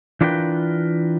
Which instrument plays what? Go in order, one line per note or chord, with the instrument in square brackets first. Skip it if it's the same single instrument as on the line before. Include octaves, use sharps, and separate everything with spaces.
[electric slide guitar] E3 D4 F4 A#4 B4 G5